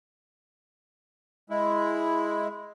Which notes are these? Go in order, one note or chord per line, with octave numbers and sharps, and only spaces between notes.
G#3 E4